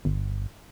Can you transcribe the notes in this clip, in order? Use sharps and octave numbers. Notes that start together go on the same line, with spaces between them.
G1